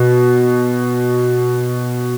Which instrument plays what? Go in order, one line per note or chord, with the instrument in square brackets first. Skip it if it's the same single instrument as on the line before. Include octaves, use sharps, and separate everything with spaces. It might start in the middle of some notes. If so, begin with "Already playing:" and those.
Already playing: [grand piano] B2